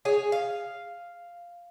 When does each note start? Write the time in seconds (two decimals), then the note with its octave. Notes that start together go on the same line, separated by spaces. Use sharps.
0.05 G#4 C#5 G#5
0.32 F5